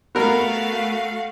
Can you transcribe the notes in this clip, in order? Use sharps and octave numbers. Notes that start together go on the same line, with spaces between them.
A3 B3 F#4 A#4 F5